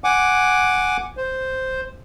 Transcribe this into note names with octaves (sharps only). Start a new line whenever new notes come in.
F#5 G#5 D6
C5